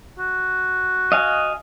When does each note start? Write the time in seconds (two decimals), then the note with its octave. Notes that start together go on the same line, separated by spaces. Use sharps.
0.19 F#4
1.12 D#5 F5 G#5